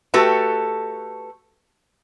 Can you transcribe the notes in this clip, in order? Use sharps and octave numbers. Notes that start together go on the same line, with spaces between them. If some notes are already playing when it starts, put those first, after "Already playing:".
A3 F#4 G4 A4 B4 G5